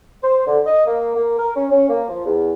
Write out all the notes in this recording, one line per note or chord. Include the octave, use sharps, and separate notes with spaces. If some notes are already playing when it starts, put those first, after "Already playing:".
C5
D3
D#5
A#3
A#3
A#4
C#4
C#4
A#3
F3
E2